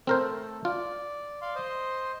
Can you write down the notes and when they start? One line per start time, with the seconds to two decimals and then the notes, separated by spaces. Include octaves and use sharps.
0.07 A3 C4 A4 A#4 C5
0.65 F4 D5
1.41 D5 F5 C6
1.55 C5 D#5 C6